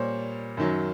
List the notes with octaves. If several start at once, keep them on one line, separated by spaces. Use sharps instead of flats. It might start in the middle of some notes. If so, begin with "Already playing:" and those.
Already playing: A#2 G3 C5 C#5
F#2 D#3 F#3